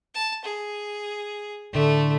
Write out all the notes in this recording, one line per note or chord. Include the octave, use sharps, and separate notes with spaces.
A5
G#4
A2 D3 A3